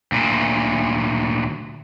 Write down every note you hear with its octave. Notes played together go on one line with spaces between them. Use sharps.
D2 A#2